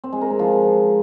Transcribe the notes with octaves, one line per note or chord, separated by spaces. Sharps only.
C4
G#3
A#4
G#3
F3